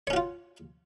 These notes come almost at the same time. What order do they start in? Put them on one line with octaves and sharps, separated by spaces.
C#5 C#4 F#4 F4